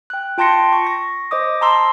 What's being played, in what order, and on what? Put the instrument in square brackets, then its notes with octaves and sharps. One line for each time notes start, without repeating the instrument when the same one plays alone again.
[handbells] G5 F#6
F4 G5 A5 C6 A#6 C#7
C#6
C#6 A#6
C5 D#5 D6 D#6
A5 A#5 C6 E6